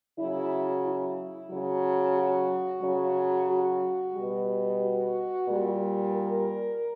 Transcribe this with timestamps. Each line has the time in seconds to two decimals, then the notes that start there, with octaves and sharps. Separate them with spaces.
0.18 C#3 F#3 E4
0.84 E4
1.50 C#3 F#3
2.17 F#4
2.82 C#3 F#3
3.48 F#4
4.15 B2 G3
4.81 F#4
5.47 A#2 G3
6.13 A#4